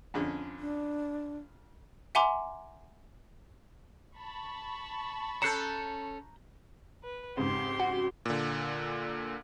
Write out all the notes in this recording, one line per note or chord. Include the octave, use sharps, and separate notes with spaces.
F2 D3 C#4
D4
E5 F#5 G#5 A#5 C6 D6
A5 B5 C#6
C#4 A4 A#5 F#6 G6 C7 C#7 E7
B4
F2 G#2 C#3 G4 C6
F#4
A#2 D3